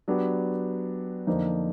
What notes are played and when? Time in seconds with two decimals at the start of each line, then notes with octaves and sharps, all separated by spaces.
0.08 F#3 B3 D4 G4
1.27 F2 D3 F3 A#3 D#4